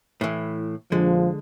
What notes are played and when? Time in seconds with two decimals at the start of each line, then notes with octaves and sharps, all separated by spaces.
0.21 A2 E3
0.92 A#1 D3 F3 G#3